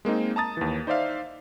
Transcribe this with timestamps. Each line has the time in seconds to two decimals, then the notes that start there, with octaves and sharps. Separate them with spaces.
0.05 G#3 A#3 C4 D#4
0.36 A5 A#5 D#6 A6
0.57 D#2 E3
0.87 D#4 C5 D5 E5 F5